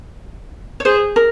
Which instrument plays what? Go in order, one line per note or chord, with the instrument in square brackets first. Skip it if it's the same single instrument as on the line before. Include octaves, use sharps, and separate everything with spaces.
[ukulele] C#5
[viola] G#4 [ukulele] C5
[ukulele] A#4